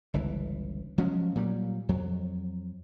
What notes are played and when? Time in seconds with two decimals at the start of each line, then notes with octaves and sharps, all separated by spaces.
0.14 G1 C#2 E3
0.98 F3 F#3 G#3 C#4
1.35 A#2 F#3 G3
1.89 F2 F#3